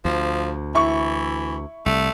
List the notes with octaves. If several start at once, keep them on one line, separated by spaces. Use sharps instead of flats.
D2 F3
E3 E4 C#6
C2 A3